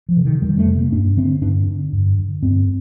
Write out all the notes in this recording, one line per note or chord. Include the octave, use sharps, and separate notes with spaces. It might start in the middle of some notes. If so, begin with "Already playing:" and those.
F3
C3
D#3
F2 G3
A3
C3
A#3
G2 D4
D3 C4
G2 D4
D3
G2
D3
G2 C4